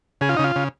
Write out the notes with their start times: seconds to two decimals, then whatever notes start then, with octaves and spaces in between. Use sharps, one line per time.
0.21 C#3 G#4
0.29 F4
0.37 C#3 D#4
0.44 F4
0.56 C#3